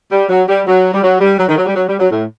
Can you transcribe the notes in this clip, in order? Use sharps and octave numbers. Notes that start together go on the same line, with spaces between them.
G3
F#3
G3
F#3
G3
F#3
G3
F#3
D#3
F#3
G3
F#3
G3
F#3
A2